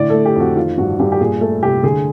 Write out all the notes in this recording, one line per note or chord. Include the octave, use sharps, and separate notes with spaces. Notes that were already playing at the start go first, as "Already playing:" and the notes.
Already playing: A2 D3 D5
A3 A4
G4
F2 F#4
D#3 F4
G2 F#4
G2 G4
G4
A#2 G#4
A3 A4
C2 G4
D3 G#4